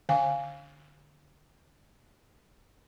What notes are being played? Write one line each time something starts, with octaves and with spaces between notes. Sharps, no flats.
D3 F5 G#5